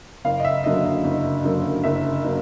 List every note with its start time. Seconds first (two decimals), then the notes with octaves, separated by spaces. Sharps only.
0.25 F#1 F5
0.40 D#5
0.45 E5
0.64 F#2 D3 F#3 A#3 D#5
0.85 D#5
1.04 F#1
1.44 F#2 D3 F#3 A#3
1.83 F#1 E5
2.25 D3 F#3 A#3